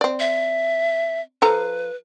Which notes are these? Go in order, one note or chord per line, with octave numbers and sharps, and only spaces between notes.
C4 D5
E5
F3 A4 B4 A#5